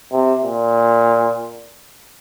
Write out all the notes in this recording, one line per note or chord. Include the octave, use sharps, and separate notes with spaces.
C3
A#2